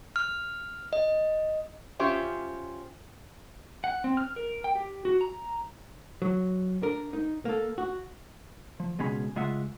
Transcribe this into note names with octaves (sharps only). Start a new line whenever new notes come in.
F6
D#5
C#4 F4 G4 C5 E5
F#5
C4
F6
A#4
G5
G4
F#4
A#5
F#3
D4 A#4
D#4
A#3 A4
F#4
F3
C#2 B2 G#3 C#4 G#4 B5
C#3 G#3 F4 E5 F#5